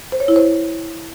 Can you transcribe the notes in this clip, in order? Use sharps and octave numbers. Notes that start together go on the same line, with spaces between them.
C5
C#5
E4
C5